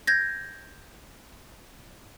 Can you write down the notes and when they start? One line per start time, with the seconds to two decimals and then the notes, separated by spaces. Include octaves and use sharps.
0.07 G6 G#6 A#6